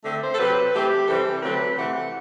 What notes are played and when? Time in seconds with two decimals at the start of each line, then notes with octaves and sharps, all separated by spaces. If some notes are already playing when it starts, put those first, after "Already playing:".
0.04 D3 A3 C4 E5
0.22 C5
0.34 A4
0.39 C3 F#3 C4 B4
0.73 E3 A3 C4 G4
1.08 C3 E3 G3 C4 A4
1.43 D3 F#3 A3 C4 B4
1.77 C3 E3 A3 C4 F#5